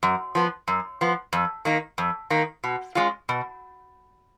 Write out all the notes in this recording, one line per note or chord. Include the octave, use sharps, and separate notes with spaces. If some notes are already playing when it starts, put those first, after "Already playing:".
F#2
F3 B3
F#2
F3 B3
F2
D#3 A#3 D#4
F2
D#3 A#3 D#4
B2
G#3 C#4 F4
B2